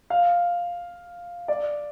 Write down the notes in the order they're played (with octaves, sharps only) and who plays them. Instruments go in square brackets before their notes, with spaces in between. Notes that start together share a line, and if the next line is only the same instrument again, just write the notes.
[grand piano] F5
D5